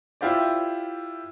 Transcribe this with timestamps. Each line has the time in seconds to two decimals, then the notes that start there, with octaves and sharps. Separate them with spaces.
0.21 E4 F4 G4 C5 D5